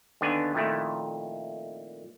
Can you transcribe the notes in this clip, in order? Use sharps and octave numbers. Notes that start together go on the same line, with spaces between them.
D#2 D3 B3 D4 B4 G#5
F2 A#2 D#3 A3 E4